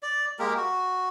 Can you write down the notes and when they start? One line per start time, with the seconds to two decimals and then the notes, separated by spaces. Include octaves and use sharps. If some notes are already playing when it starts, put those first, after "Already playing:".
0.03 D5
0.39 G#3 A#3 G4 A#4
0.57 F#4